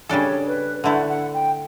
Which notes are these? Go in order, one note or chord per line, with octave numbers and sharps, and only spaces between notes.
C#3 G3 D4 A4 C#5
B4
D3 A3 E4 F#5
F#5
G5